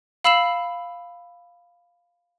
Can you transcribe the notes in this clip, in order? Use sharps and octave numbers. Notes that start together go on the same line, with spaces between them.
F5 B5 E6 C7 E7 F#7